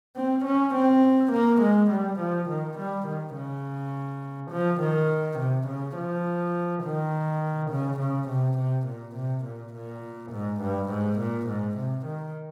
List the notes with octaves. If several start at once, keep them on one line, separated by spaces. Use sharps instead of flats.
C4
C#4
C4
A#3
G#3
G3
F3
D#3
G3
D#3
C#3
F3
D#3
C3
C#3
F3
D#3
C#3
C#3
C3
C3
A#2
C3
A#2
A#2
G#2
G2
G#2
A#2
G#2
C3
D#3